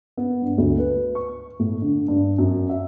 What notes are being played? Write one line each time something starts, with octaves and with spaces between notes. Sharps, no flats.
B3
G2
D2
B4
C#6
A2
D3
G2
F#2
E5